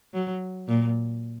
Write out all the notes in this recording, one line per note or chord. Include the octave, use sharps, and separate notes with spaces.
F#3
A#2